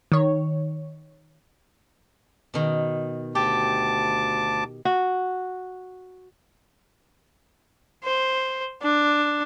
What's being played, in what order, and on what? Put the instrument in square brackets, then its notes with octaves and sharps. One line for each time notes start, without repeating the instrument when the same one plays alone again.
[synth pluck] D#3 C#5
[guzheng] B2 D#3
[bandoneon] D2 A5 D6 [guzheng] G4
[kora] F#4
[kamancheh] C5
D4